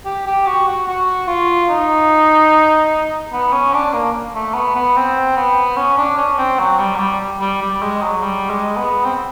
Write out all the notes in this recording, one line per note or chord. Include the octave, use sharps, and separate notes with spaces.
G4
G4
F#4
F#4
F#4
F4
D#4
B3
C#4
D4
A#3
A3
B3
B3
C4
B3
C#4
D4
C#4
C4
F#3
G3
F#3
G3
G3
G3
G#3
F#3
G3
G#3
B3
C4